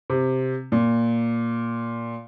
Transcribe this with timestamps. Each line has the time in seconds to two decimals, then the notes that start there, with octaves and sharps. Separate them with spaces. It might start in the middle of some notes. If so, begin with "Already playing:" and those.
0.10 C3
0.72 A#2